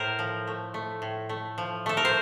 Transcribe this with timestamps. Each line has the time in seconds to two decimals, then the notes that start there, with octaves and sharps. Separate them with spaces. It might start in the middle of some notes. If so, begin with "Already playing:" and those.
Already playing: A2 A#4 C5
0.19 F3
0.47 A3
0.74 A3
1.02 A2
1.29 A3
1.58 F3
1.86 A3 A4
1.97 A#4
2.05 C5